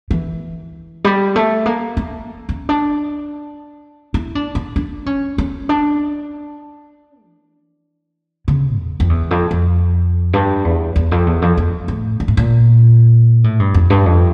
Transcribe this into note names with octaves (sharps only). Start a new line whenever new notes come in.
E3
G3
A3
A#3
A#3
C#4
D4
E4
D4
D4
D4
C#4
C#4
D4
E3
C#3
E2
F2
E2
F2
F2
G2
E2
E2
F2
E2
F2
F2
A2
A#2
A2
A#2
A2
G2
F2
G2
F2